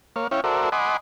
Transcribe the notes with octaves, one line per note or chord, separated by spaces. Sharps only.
A#3 C#5 F5
C#4 E4 C#5 F5 G5
F#4 A4 A#4 C5 D5 E5
D#5 F#5 G#5 B5 C6 D6